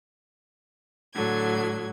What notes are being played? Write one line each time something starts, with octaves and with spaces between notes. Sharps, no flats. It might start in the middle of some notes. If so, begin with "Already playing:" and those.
A2 D3 F#3 G#6